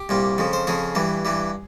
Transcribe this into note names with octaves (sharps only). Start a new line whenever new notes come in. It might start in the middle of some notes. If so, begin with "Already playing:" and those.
Already playing: G4
C2 A#2 G3
F2 C#3 F3
C5
F2 C#3 F3 G#4
G2 E3 G3
G2 E3 G3